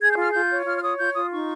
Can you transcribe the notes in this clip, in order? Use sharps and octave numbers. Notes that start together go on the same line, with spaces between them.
G#4 G#6
G6
F4 F6
F4 G6
C#5
F4 F6
F6
C#5 D#6
F4 G6
F4 D#6
D#4 C#6